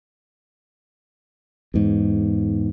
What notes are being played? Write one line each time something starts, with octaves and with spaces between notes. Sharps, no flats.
E2 G#2